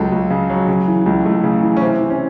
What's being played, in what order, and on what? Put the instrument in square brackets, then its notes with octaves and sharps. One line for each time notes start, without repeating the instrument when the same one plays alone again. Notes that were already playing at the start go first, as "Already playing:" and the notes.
Already playing: [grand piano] C#2 C#3 F#3 A4
C#2
C#3
F#3
C#3
E3
C#2
C#2 A3
C#3
E3
C#4
C3 C4
E3
C#4